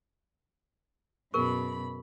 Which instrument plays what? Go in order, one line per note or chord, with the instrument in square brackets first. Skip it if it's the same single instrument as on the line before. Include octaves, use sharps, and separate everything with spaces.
[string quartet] F#2 B5 [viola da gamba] B2 [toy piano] G#4 A#4 C#6